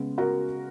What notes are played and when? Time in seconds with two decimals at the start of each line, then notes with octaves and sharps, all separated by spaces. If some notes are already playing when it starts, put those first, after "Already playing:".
Already playing: C#3 G#3 B3
0.18 F#4 A#4